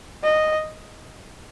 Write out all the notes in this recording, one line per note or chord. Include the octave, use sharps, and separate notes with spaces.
D#5